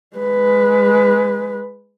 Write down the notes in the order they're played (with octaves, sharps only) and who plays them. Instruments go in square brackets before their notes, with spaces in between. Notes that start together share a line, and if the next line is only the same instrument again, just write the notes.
[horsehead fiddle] G#3 B4